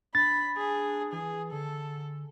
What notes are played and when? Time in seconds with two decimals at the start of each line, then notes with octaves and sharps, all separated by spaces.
0.15 D4 B5 A6
0.57 G#4
1.12 E3 G#4
1.52 D3 A4